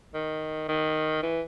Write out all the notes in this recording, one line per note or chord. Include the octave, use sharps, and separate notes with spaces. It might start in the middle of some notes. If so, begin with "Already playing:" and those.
D#3
D#3
E3